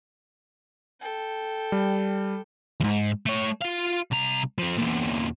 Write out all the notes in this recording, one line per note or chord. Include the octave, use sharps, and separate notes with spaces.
A4 G5
G3
E2 G#2
A3 C#5
F4 F5
C2 A#5
F3 C4
E2 A#2